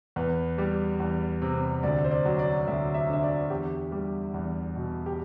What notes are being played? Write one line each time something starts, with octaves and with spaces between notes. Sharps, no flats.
E2 B4
G3
E2
C3
D2 D5
C5
D5
F#3
D5
D2 E5
E5
D3 E5
D5
E2 G4
G3
E2
B2
G4